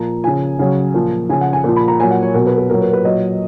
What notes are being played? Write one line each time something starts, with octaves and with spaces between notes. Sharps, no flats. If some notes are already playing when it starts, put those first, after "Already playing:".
Already playing: A#2 F3 A#5
C#3 F3 G#5
C#3 F#3
A#2 F3
C#3 F3 G#5
F#5
G#5
A#2 F3
B5
A#5
A#2 F#3 G#5
F#5
C#5
B2 F#3 A#4
B4
B4
A#2 F#3 A#4
B4
B4
A#2 F#3 D#5